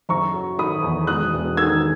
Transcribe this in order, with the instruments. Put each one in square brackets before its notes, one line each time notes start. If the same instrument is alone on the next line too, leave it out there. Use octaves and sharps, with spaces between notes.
[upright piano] F#1 A#5 C#6
F#3
D#3 B5 D#6
E2
E1 D#6 F#6
E1
D#3 E6 G#6